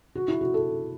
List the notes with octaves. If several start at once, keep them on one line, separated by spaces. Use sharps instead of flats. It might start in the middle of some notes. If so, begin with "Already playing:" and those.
F#4
E4
F#4
A4